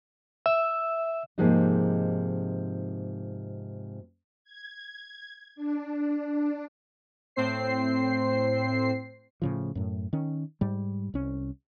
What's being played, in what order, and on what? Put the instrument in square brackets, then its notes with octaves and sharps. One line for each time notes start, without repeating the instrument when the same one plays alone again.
[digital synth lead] E5 [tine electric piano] E6
[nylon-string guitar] G#2 C3 F3 G#3 A#3 D#4
[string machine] G#6
D4
[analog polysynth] A2 C4 C5 C7
[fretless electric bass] A2 C#3 F3
F#2 A2
D#3 C#4
G#2 G3
C2 C#4